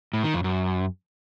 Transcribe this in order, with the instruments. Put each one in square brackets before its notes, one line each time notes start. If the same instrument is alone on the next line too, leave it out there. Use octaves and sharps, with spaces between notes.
[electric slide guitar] A2
D#3
F2
F#2